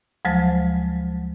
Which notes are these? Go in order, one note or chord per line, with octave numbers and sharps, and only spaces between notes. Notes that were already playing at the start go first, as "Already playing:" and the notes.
D2 F3 F#3 G#3 C5 A5